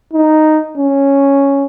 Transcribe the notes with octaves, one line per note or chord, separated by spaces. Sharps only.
D#4
C#4